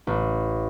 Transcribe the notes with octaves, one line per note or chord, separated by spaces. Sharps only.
A1